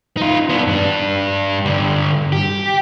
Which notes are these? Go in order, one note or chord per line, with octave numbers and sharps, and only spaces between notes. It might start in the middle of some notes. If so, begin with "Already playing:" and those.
D#4 F4
B3 D4
G2 D4
G2 D3
G4